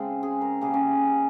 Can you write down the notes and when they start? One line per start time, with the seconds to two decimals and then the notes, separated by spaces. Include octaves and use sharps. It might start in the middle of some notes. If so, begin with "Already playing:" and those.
Already playing: C#3 G#3 C4
0.23 G#4
0.41 A#4
0.61 C#3 G3 A#3 G#4
0.74 C#4